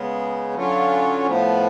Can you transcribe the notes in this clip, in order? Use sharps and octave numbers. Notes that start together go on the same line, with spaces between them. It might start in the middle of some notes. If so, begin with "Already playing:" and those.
Already playing: C#3 G#3 B3
D3 F#3 C#4 F4
A2 F3 B3